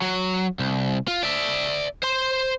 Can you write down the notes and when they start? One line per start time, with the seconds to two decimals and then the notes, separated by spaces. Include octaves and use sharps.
0.02 F#3
0.59 C2
1.08 F4
1.23 D5 E5
2.03 C5 C6